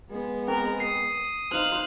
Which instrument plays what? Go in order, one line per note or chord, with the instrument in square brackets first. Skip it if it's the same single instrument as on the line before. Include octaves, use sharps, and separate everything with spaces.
[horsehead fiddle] G#3 B3
[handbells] C4 [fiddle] A#4
[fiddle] D#6 [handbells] C7
[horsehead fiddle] D#4 C5 [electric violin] F5 F#6